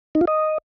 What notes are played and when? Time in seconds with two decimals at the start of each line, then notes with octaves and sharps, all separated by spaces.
0.15 D#4
0.21 F4
0.27 D#5